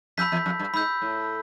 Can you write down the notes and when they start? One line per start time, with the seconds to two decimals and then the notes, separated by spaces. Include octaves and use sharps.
0.18 F2 B5 E6 G6 B6
0.32 E2
0.46 F2
0.59 G2
0.73 G#2 B5 E6 G6
1.02 A2